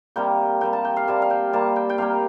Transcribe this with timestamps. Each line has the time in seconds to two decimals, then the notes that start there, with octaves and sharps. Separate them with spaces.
0.16 C3 G3 A#3 G5
0.61 C3 G3 A#3 G5
0.73 A5
0.85 G5
0.96 F5
1.07 C3 G3 A#3 A5
1.22 F5
1.30 G5
1.53 C3 G3 A#3 A5
1.76 G5
1.90 G5
1.98 C3 G3 A#3 F5